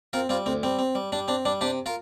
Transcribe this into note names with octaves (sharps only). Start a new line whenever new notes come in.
C4 F4 A#4
G3 C4 F4
D2 C4
G3 C4
C4
G3
G3 D4
C4 D4
G3 D4
C3 D4 G4
F4 A#4